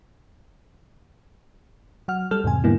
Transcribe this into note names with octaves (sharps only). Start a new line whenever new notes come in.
F#3 F#5 F6
G3 A4 F6
E2 G#2 C3 G#5
G#2 D3 G3 A#3 B3 E4